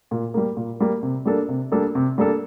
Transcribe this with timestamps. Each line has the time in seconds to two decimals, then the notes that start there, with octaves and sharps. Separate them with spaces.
0.11 A#2
0.34 G3 A#3
0.57 A#2
0.80 G3 A#3
1.03 C3
1.25 G3 A#3 D4 A4
1.49 C3
1.72 G3 A#3 D4 A4
1.95 C3
2.18 G3 A#3 D4 A4